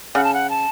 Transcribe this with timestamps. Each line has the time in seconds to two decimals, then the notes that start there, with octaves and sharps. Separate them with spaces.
0.15 C#3 F#5
0.24 A5
0.34 F#5
0.50 A5